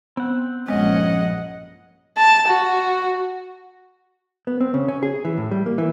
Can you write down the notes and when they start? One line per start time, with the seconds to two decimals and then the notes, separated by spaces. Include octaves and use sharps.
0.17 B3 C4 F#5
0.68 A#1 G2 G#3 C#4 D#5 F#5
2.18 A5
2.49 F#4
4.47 B3
4.60 C4
4.74 C#3
4.88 C#4
5.03 G#4
5.25 E3
5.37 A2
5.51 G3
5.66 A#3
5.78 E3